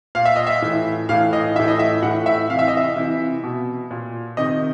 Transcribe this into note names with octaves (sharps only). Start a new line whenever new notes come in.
A#2 F5
E5
D#5
E5
A2 E3
A2 E3 F5
D#5
A2 E3 E5
D#5
E5
A2 E3 F#5
E5
C3 E3 F5
E5
D#5
E5
C3 E3
B2
A#2
C3 D#3 D#5